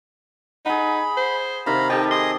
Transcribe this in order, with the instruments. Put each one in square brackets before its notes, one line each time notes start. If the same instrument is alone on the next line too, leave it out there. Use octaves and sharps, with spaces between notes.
[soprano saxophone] D#4 [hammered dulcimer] G#4 F#5 [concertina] B5
[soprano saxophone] C5
[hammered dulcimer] C3 D#3 [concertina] F5 A#5 B5
[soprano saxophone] D#4 [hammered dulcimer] G4 A4 [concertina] D#5 G5 A5
[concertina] G#4 D#5 D#6 [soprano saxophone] C6